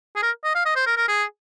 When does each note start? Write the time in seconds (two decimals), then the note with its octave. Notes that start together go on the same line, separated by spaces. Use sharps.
0.16 G#4
0.23 A#4
0.44 D#5
0.55 F5
0.66 D#5
0.76 C5
0.87 A#4
0.97 A#4
1.08 G#4